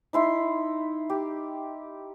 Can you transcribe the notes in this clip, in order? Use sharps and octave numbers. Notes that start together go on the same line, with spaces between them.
D#4 E4 C6
G4